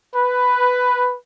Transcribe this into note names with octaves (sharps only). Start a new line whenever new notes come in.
B4